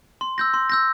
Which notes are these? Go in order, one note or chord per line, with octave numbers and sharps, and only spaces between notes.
C6
E6 G6 A#6
C6
E6 G6 A#6